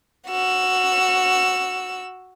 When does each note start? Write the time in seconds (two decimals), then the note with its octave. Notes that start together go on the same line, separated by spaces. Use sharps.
0.28 F#4 E6